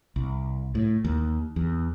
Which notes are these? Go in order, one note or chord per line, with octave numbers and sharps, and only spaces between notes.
C2
A2
D#2
E2